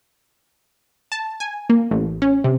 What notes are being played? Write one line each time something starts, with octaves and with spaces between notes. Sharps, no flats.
A5
G#5
A#3
A1
C#4
C3